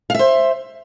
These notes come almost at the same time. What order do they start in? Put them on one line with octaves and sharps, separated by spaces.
F5 E5 C5